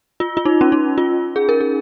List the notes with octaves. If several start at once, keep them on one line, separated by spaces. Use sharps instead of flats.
F4
F4
D#4
C#4
D#4
F4
G#4
A#4
G#4